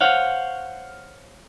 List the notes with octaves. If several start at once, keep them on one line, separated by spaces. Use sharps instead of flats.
C5 C#5 F5 F#5